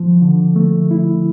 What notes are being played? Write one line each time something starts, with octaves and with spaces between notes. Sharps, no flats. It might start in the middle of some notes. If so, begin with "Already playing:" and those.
Already playing: F3
D3
A3
E4